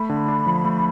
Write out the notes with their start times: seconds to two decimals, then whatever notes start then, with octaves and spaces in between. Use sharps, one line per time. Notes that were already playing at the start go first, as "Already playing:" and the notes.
Already playing: A3 B5
0.09 D3
0.28 D4
0.47 F3
0.65 A3